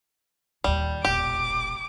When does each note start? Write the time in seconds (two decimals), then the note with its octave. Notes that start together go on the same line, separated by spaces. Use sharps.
0.64 A#1 D#2 G3
1.05 E1 A#1 G4 D6